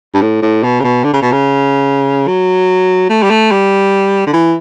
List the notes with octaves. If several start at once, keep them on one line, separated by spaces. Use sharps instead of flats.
G2
A2
A2
B2
C#3
B2
D3
C#3
B2
C#3
F#3
A3
G3
A3
G3
D3
E3